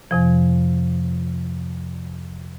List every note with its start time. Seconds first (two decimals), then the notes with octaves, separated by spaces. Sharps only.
0.11 F2 C3 F3